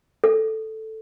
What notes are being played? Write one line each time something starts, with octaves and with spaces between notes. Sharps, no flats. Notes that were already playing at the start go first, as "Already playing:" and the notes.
A4